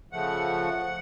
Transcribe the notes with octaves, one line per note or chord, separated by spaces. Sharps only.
C#3 F3 A3 F#5